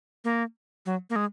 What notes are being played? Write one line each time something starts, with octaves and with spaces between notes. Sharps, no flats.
A#3
F#3
A#3
G#3